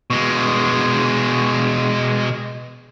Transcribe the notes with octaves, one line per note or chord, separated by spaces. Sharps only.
B2 G#3